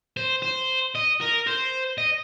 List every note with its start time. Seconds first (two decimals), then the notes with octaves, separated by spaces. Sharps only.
0.17 C5
0.43 C5
0.95 D#5
1.21 A#4
1.47 C5
1.98 D#5